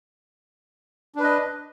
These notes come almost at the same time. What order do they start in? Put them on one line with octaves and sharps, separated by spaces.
D4 B4 D#5